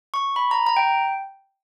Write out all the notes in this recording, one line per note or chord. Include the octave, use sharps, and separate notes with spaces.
C#6
B5
A#5
A#5
G5